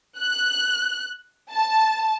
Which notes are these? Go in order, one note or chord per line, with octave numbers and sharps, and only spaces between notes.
F#6
A5